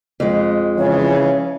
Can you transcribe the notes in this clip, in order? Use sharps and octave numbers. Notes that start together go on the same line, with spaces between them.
F2 G#3
C#3 E3 F3 C#5